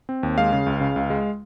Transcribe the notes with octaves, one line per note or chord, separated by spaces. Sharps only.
C4
D#2
G#3 F5
C#3
C#2
C#3
C#2
G#3